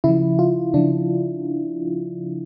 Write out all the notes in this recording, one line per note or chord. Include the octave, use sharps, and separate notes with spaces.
C#3 F3 E4
F4
C#3 F3 D4